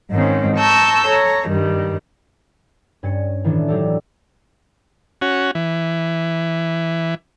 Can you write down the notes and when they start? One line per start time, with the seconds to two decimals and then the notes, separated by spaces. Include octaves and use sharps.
0.11 G#2 D#3 G#3 C4 C#4
0.56 A5 A#5 C#6 E6 G6
1.06 A4 C#5 A#5
1.48 G2 D#3 G3
3.03 G2 C#4 A6 C#7
3.44 A2 D#3 E3 C#4 D4
3.68 F#3 D4 D#4 G4 A4 D5
5.22 C#4 F#4
5.55 E3